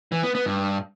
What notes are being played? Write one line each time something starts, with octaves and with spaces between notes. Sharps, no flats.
E3
B3
B3
G2